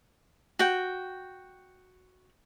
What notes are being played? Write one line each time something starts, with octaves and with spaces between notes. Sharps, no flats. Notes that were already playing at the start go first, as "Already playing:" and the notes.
F#4 G5